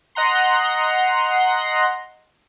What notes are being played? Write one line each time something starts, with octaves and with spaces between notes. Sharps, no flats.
D#5 F#5 A#5 C6